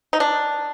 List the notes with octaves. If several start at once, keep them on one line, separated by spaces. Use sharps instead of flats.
D#4
D4